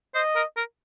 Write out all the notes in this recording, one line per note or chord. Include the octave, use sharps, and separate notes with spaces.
C5 D#5
A#4
A#4